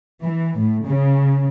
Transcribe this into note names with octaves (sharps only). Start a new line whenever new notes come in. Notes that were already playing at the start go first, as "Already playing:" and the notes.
E3
A2
C#3